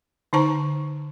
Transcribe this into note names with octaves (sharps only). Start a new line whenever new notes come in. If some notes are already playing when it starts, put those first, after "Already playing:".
D3 D#4 C5 A5 A#5 C#6